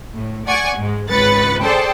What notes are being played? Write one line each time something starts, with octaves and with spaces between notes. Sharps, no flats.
A2
D5 F#5 G#5 C#6
G#2 G#3
G#1 C#2 B4 F#6 A6 C#7
G#4 A4 C5 D5 G5 A5